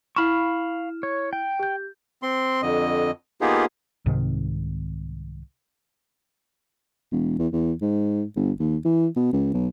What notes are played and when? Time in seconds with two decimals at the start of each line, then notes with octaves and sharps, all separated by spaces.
0.16 E4 F5 B5 C#6 F6 E7
1.03 C#5
1.33 G5
1.59 G4 G6
2.22 C4 C6
2.62 F2 D3 D#5
3.41 A#3 B3 D#4 F4 G4 G#4
4.06 C2 G#2 C3 D#3
7.12 E1
7.39 E2
7.53 E2
7.81 G#2
8.36 G1
8.60 D#2
8.85 E3
9.16 B2
9.33 C#2
9.54 B1